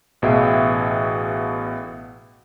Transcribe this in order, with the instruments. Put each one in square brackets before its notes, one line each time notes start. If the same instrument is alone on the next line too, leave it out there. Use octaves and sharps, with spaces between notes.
[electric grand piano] A1 B2 G#4 E5 F5 G5